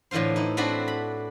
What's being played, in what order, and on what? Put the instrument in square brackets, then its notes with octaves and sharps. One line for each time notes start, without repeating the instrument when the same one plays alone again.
[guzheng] A2 D3 E3 F4 C5
D#4 E4
A3 C4 D4 F#4 B4 A5
B5